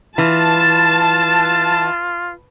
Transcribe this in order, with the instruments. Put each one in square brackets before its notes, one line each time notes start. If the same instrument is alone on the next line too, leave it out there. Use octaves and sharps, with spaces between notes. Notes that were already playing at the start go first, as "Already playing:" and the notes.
[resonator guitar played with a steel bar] E3 [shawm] F4 [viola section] A5